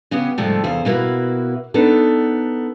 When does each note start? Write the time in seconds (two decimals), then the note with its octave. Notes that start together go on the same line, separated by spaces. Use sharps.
0.11 C#3 B3 C#4 G4
0.38 F2 G#2 C3 F3 G3 A3
0.64 E2 C3 C5 F5
0.85 B2 A#3 E4 F#4 B4
1.74 B3 D4 D#4 A4